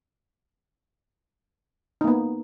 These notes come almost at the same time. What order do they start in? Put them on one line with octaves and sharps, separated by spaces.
D#4 A#3 B3